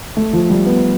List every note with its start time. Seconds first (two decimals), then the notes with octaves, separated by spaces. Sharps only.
0.17 A3
0.33 F3
0.50 G3
0.66 B3